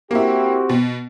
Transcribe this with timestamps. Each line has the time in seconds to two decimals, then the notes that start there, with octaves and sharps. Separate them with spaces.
0.11 A#3 C4 E4 F#4 G4
0.69 B2